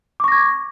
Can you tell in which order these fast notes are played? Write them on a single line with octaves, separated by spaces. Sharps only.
D6 C#6 A#6 G#6